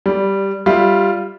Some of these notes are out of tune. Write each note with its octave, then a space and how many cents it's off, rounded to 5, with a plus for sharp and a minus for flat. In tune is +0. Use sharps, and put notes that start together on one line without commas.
G3 +0 D5 -15
G3 +0 F4 +0 E5 +0